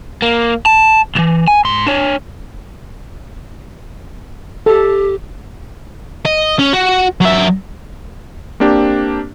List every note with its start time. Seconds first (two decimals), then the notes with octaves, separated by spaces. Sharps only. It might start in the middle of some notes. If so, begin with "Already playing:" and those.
0.22 A#3
0.66 A5
1.15 C2 E3
1.48 G#5
1.65 G#2 C6
1.87 D4 C#5
4.66 G4 A4
6.25 D#5
6.59 C#4
6.73 F#4
7.21 F#3 E5
8.60 A#3 C4 D4 G4